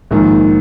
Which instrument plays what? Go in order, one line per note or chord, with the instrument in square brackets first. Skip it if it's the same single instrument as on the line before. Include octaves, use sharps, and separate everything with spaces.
[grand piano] A#1 G#2 D#3 A#3